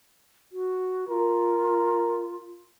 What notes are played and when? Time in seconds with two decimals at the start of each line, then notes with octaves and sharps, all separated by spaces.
0.52 F#4
1.09 F4 A#4